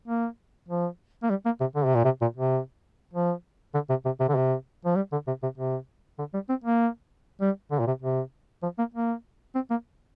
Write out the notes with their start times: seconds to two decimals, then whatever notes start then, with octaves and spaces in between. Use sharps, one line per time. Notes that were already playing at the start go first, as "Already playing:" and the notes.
0.08 A#3
0.68 F3
1.23 A#3
1.30 G3
1.45 A#3
1.60 C3
1.76 D3
1.85 C3
1.95 A#2
2.05 C3
2.21 A#2
2.36 C3
3.14 F3
3.74 D3
3.89 C3
4.05 C3
4.20 C3
4.29 D3
4.35 C3
4.85 F3
4.96 G3
5.12 D3
5.27 C3
5.43 C3
5.58 C3
6.19 D3
6.34 G3
6.49 C4
6.64 A#3
7.41 G3
7.71 D3
7.80 A#2
7.87 C3
8.02 C3
8.63 F3
8.79 A#3
8.94 A#3
9.55 C4
9.70 A#3